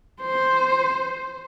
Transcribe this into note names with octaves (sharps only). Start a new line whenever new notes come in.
C5